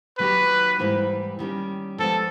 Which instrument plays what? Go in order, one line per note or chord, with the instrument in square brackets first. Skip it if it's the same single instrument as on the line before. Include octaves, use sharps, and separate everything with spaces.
[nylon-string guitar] D#3 F#3 A#3 D#4 G4 [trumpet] B4
[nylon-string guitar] G#2 E3 G3 A#3 D#4
D#3 G3 A#3 C#4
[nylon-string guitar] F3 G#3 B3 D4 F4 [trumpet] A4